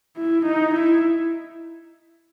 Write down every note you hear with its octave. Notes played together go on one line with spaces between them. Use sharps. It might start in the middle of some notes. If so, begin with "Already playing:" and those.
E4
D#4
E4